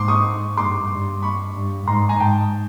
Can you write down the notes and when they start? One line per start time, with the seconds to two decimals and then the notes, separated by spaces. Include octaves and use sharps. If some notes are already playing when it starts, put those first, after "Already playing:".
Already playing: G#2 C6 D6
0.08 C#6 D#6
0.57 G2 C6 D6
0.90 G2
1.22 B5 C#6
1.55 G2
1.87 G#2 A#5 C6
2.09 G#5 A#5
2.20 G#2 G5 A5